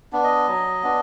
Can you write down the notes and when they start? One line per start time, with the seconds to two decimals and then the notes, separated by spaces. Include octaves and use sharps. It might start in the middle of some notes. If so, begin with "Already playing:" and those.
0.13 B3 D4
0.24 D#5
0.47 F#3
0.83 B3 D4